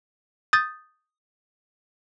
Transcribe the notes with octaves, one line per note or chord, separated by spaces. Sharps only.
D#6 G6 A6